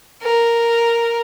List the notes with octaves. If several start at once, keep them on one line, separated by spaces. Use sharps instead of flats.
A#4